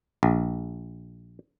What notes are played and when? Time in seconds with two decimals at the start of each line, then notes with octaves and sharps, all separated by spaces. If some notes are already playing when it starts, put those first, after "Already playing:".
0.23 A#1